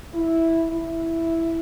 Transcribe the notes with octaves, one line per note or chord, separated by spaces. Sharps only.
E4
E4